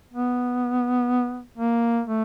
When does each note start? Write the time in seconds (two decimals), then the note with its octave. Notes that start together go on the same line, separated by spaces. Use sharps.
0.13 B3
1.58 A#3
2.06 A3